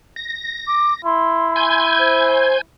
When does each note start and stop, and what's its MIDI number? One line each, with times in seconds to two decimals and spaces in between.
0.16 1.02 94
0.67 0.93 86
1.05 2.64 64
1.05 1.96 84
1.56 2.61 80
1.56 2.61 91
1.56 2.61 92
1.99 2.57 72